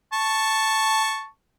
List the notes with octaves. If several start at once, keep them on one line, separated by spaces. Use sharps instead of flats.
A5 C#6